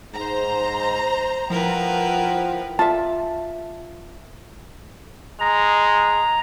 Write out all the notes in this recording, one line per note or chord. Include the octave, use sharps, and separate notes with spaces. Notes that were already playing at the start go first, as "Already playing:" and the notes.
G#2 C5 A#5
F3 E4 A#4 B4 F#5 G5
F4 E5 A5
G#3 A#5